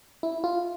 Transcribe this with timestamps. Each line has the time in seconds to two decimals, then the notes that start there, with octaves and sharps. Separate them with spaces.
0.23 E4
0.44 F4